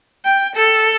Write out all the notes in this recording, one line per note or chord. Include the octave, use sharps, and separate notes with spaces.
G5
A4